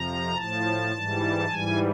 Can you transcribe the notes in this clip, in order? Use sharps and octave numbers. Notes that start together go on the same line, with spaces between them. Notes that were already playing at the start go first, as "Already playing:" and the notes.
Already playing: F2 C3 F3 A#5
A2 F3 A5
G#2 E3 G3
G#2 E3 G3 G#5